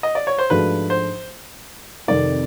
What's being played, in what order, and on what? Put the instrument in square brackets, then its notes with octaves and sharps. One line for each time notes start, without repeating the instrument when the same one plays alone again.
[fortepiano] D#5
D5
C#5
C5
[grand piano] G#2 F3 A3 D4 F#4 [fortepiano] B4
[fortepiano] C5
[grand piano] F2 C3 D#3 [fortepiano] D5